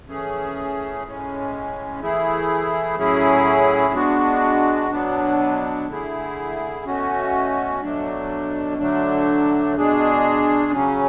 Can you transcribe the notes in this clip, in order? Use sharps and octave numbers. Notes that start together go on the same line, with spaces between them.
E3 A3 C#4 G#4
A2 G#3 C#4
E3 A3 E4 G#4
A2 F#3 C#4 E4 G#4
G#3 B3 D4 F#4
B2 F#3 B3 D4
D3 A3 E4 G#4
B2 A3 C#4 F#4
B2 F#3 A3 D4
D3 F#3 A3 D4
B2 G#3 D4 G#4
C#3 F#3 C#4